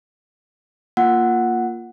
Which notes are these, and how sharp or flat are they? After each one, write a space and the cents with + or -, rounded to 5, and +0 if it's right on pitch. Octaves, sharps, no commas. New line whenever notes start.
A#3 +0 F4 -5 F#5 +0